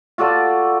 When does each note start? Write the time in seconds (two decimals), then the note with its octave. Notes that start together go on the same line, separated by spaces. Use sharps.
0.18 F4 F#4 A4 D5